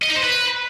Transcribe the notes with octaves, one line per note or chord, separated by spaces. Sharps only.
D#5
D#4
C5
B4